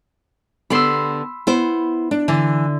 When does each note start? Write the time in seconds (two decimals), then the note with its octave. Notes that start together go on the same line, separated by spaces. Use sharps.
0.70 D3 B3 G4 B5 C6 E6
1.47 B3 E4 C5
2.11 D4
2.28 D3 E3